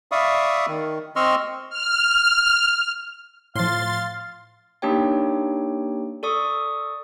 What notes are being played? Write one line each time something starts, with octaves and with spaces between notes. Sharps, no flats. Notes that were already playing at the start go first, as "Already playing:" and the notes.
D5 E5 F5 B5 C#6 D#6
D#3
C4 D#5 C6 C#6 E6 F6
F6
A2 F3 F5 C6 A6
A#3 D4 D#4 G4 C#5 G5
A4 D5 C#6 D#6